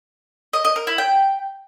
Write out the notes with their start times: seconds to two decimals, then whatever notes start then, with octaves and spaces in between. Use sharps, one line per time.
0.53 D#5
0.65 D#5
0.76 A#4
0.87 E4
0.98 G5